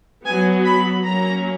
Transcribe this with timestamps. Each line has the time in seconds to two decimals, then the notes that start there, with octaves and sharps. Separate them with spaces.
0.25 F#3 B3 G#5
0.65 B5
1.04 F#3 A#3 C#4 A#5